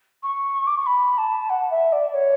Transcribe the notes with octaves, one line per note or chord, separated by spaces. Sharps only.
C#6
D6
C#6
B5
A5
F#5
E5
D5
C#5